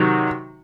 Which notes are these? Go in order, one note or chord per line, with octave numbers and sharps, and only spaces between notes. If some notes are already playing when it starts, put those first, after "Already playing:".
Already playing: C3 D#3 F#3